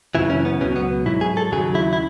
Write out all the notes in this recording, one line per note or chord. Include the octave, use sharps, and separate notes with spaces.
F#2 C#3 E3 E4
C#4
B3
C#2 B2 F#3 C#4
B3
G#2 F#3 E4
G#4
A4
D#2 C#3 F#3 G#4
E4
E4